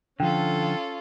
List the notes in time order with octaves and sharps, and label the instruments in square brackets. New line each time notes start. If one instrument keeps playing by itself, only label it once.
[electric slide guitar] D3 F3 [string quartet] C#4 F4 A4 [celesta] G5